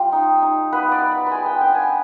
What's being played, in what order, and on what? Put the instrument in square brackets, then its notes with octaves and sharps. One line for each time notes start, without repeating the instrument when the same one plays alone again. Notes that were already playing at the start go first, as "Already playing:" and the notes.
Already playing: [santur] G3 F4 G4
D#4
D#4
B3 B4
D5
B3
B5
G#3 G#5 B5
G5
D4 G5
G#5